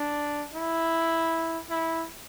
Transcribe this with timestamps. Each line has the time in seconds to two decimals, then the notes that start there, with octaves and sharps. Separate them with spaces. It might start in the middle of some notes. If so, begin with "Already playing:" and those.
Already playing: D4
0.54 E4
1.70 E4